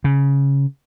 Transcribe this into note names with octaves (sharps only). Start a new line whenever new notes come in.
C#3